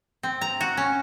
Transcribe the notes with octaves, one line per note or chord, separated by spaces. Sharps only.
C4
A#5
F#4
C#4